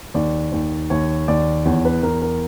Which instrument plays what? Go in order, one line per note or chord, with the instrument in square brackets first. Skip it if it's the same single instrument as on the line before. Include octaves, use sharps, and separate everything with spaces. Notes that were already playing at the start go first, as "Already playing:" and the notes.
[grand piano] D#2 D5
D#2
D#2 C#5
D#2 D5
E2 C#5
B4
E2 A#4
A#4